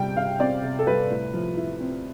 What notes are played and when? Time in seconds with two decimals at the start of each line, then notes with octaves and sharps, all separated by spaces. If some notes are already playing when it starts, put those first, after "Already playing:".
Already playing: C3 G3 G5
0.17 C3 F5
0.40 C4 D5
0.63 C3
0.79 A4
0.87 G3 B4
1.10 A2
1.33 F3
1.57 E4
1.80 C4